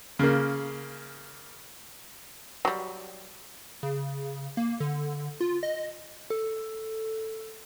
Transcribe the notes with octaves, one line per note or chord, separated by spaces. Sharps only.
C#3 A#3
F#3 G3
C#3
A#3
D3
F4
D#5
A4